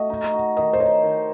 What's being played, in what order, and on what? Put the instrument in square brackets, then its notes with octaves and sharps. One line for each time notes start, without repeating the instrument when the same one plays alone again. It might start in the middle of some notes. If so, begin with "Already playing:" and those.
Already playing: [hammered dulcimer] A3 F#4 [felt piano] D#5
[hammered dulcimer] D#4
F#4
[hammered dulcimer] D#3 [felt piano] D#5
[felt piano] C5
[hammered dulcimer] D#4 [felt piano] C#5
[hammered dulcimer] D#3